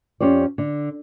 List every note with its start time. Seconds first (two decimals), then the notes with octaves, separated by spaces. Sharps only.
0.21 F2 C#4 G4 C5 D5
0.58 D3